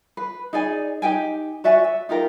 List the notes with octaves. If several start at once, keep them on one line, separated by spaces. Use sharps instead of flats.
B4
D#4 G#4 D5 G#5
D#4 G4 G5 G#5
F#4 D5 E5 G#5
E5
D#4 F4 G4 A#4